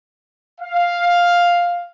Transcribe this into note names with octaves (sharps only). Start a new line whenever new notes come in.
F5